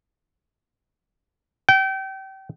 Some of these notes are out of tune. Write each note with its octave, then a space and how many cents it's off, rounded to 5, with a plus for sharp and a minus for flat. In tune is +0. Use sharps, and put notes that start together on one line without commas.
G5 -30